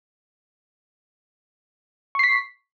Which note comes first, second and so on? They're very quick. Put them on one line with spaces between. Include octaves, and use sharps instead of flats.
C#6 C7 B6